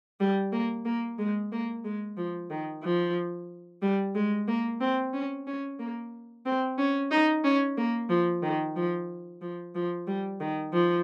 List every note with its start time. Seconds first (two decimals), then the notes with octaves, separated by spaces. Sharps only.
0.20 G3
0.52 A#3
0.85 A#3
1.19 G#3
1.52 A#3
1.84 G#3
2.17 F3
2.50 D#3
2.83 F3
3.82 G3
4.15 G#3
4.48 A#3
4.81 C4
5.13 C#4
5.47 C#4
5.79 A#3
6.46 C4
6.78 C#4
7.11 D#4
7.44 C#4
7.77 A#3
8.09 F3
8.43 D#3
8.76 F3
9.41 F3
9.75 F3
10.07 G3
10.40 D#3
10.73 F3